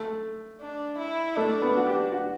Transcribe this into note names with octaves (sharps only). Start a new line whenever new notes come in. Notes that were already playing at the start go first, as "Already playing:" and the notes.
Already playing: A3
D4
E4
A3 D4
B3
F#4
G4
F#4